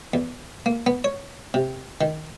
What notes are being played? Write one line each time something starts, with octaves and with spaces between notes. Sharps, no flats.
E2
A#3
B3
C#5
C3
D#3